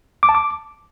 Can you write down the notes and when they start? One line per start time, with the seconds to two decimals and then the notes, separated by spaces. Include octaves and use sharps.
0.23 D6
0.29 A5
0.35 D6